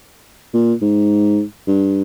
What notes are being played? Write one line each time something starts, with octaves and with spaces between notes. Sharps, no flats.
A#2
G#2
G2